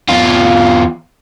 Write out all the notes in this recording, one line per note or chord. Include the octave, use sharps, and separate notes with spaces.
E2 F4